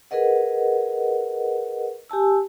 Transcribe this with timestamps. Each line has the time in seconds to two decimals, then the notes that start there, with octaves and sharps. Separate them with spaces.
0.11 G#4 A#4 B4 D#5 F#5
2.09 G4 G#5 A5 E6